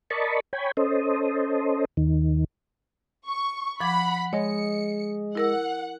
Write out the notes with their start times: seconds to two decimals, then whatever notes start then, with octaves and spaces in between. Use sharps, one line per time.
0.10 A#4 D5 D#5 A5 B5 C#6
0.53 C#5 G5 G#5 B5
0.77 C#4 A4 C5 D#5
1.97 D#2 D#3
3.26 C#6
3.80 F3 F#5 B5 D6 G#6
4.33 G#3 G#4 C#5 D#5 C#7
5.35 E4 A#4 F#5 E6